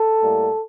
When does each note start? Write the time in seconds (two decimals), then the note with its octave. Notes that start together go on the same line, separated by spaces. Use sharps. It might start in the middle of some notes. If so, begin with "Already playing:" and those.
Already playing: A4
0.22 A2 G3 A#3